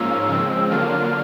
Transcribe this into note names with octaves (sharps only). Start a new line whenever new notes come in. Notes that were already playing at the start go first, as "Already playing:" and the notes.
Already playing: G#2 F3 A#3 C#4 F4 E6
C#3 F3 G#3 C4
D3 F#3 A#3 D4 F4 F6